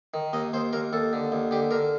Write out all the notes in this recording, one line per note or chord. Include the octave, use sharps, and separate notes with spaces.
D#3
D#2 D#5
D#2 C5
D#2 A#4
D#2 A4
D3
D#2
D3 G4
D3 A#4